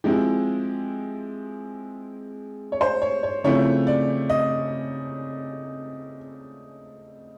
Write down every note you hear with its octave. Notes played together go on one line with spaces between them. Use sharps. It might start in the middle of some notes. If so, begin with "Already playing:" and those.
F3 G#3 C4 E4 G4
C#5
C5
C#5
C#5
C#3 F3 A3 C4 E4 C#5
D5
D#5